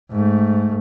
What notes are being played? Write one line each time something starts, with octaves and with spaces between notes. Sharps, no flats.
G#2 A3